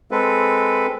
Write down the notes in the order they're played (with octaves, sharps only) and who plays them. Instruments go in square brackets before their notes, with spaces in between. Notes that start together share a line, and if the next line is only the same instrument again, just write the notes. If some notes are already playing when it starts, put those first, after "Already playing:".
[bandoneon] G#3 C4 A4 B4